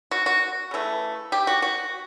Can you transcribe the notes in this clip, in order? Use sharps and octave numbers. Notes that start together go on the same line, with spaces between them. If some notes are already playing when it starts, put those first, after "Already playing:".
F#4
F#4
C#3 E3 A3
G4
F#4
F#4